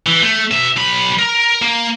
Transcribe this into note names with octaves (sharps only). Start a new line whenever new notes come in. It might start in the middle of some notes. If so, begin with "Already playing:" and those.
E3
A3
B2 E5
B1 B5
A#4
A#3